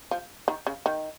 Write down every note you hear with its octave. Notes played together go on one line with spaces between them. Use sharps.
F3
D#3
C#3
D#3